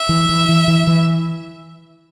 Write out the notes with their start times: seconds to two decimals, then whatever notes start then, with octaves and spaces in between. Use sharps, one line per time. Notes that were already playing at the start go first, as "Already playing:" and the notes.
Already playing: E5
0.09 E3
0.29 E3
0.49 E3
0.68 E3
0.87 E3